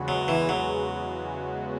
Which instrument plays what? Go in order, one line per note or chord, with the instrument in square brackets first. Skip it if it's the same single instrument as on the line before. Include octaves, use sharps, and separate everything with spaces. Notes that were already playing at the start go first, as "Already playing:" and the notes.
Already playing: [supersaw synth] E2 C#3 G#3 B3 F#4
[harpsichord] F#3
E3
F#3